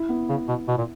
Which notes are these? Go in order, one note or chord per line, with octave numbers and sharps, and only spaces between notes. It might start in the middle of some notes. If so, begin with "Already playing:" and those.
Already playing: E4
B3
C#3
B2
B2
A#2